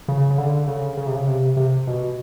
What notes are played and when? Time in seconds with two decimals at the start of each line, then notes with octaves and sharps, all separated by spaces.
0.08 C#3
0.30 C#3
0.38 D3
0.68 C#3
0.97 C#3
1.07 C3
1.16 C#3
1.27 C3
1.57 C3
1.87 B2